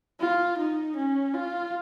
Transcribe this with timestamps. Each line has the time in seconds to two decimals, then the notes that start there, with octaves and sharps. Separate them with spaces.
0.20 F4
0.58 D#4
0.96 C#4
1.34 F4